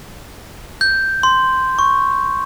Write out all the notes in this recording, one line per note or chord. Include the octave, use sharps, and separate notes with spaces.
G6
C6
C#6